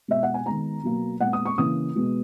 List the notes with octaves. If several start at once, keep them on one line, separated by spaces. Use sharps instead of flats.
B2 G#3 B3 E5
F#5
G#5
D#3 G#3 B3 A#5
B2 F#3 A#3
A#2 G#3 B3 F#5
D#6
C#6
C#3 E3 A#3 D#6
B2 G#3 B3